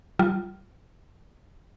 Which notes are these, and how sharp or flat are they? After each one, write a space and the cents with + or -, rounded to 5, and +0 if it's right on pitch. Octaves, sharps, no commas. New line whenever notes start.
G3 -35 F4 +0